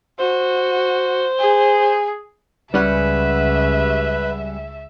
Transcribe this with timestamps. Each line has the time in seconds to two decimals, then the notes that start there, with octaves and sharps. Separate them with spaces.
0.19 F#4 C5
1.39 G#4
2.74 C#2 G3 C#4 B4 E5 F#5